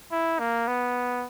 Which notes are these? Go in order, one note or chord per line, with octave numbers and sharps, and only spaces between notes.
E4
A#3
B3